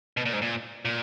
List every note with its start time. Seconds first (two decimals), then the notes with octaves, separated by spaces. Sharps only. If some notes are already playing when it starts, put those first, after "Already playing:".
0.17 B2
0.25 A#2
0.33 G#2
0.42 A#2
0.85 A#2